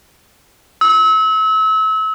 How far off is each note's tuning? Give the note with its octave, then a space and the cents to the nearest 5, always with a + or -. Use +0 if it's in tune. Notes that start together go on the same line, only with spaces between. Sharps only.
E6 -35